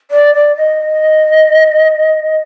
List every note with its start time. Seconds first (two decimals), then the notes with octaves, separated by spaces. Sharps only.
0.11 D5
0.35 D5
0.56 D#5